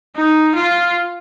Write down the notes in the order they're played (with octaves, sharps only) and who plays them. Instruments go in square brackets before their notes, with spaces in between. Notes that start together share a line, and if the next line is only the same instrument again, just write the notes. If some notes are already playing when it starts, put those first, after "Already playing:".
[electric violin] D#4
F4